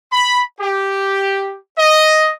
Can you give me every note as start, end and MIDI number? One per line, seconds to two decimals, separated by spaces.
0.13 0.42 83
0.60 1.57 67
1.78 2.31 75